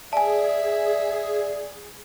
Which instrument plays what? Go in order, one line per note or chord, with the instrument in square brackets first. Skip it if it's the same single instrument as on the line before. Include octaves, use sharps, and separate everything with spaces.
[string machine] G#4 [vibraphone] D5 [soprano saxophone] E5 [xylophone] G#5 A5